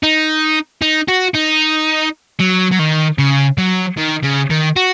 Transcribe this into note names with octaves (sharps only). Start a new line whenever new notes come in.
D#4
D#4
F#4
D#4
F#3
F#3
D#3
C#3
F#3
D#3
C#3
D#3
F#4